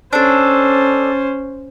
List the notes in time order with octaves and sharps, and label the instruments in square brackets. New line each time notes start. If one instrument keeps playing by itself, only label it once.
[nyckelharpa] C#4 C5 [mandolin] D4 A4